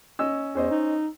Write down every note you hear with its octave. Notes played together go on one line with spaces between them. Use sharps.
C#4 D#5 E6
E2 C#4 C5 D#5
D#4